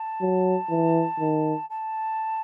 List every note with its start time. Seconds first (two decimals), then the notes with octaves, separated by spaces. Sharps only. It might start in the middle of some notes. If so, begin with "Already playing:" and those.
Already playing: A5
0.22 F#3
0.70 E3
1.20 D#3
1.69 A5